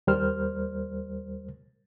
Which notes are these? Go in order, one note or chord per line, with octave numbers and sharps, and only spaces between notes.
D#2 G3 A#4 C5 F6